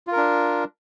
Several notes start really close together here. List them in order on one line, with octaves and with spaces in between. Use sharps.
F4 A#4 D4